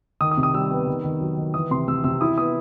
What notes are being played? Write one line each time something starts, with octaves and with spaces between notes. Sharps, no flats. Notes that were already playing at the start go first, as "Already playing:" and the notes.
D#3 D#6
D#6
C3
D#6
G3 E6
B3
D#3
D#3
F#3
D#3
E3 D#6
C3 C6
C3 E6
C3 E6
E4 D#6
B3 D#6